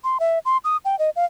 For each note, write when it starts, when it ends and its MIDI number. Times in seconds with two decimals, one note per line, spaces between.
0.04 0.18 84
0.20 0.39 76
0.45 0.57 84
0.64 0.77 87
0.85 0.98 79
0.99 1.10 75
1.16 1.25 77